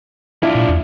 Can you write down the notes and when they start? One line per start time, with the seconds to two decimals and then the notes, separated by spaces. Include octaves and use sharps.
0.43 D4 E4 F4
0.55 A#2
0.69 E2